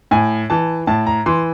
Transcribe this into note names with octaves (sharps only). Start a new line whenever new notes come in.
A2 G#5
E3 A5
A2 A5
A#5
E3 C6